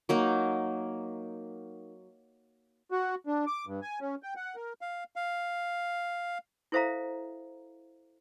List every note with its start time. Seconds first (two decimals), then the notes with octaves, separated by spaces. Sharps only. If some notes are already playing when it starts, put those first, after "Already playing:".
0.09 F#3 A#3 D#4
2.91 F#4
3.27 D4
3.47 D6
3.67 G2
3.82 G#5
4.01 C#4
4.23 G5
4.36 F#5
4.56 A#4
4.81 F5
5.16 F5
6.72 E4 A4 C5 E5 F5 A#5